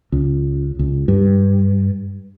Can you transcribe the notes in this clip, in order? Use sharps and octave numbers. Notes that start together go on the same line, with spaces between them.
C#2
C#2
G2